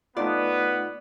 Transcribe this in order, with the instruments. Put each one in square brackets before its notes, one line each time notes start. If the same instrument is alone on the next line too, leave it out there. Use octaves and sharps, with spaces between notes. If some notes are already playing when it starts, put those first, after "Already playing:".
[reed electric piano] A3 D#4 F4 [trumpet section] B3 [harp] D5